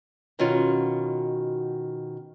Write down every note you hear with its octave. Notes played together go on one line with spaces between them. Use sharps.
B2 D#3 C#4 F4 F#4